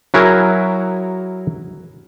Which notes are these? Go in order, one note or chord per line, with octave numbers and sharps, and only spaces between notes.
F#3 E4 F#4 G#4 A#4